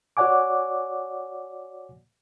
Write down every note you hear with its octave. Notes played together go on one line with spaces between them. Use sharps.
F#4 C#5 D5 F#5 G#5 D6